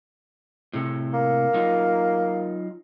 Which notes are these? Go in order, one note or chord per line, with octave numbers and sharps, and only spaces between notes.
A2 C3 A4
A#3
F#3 D#4 F4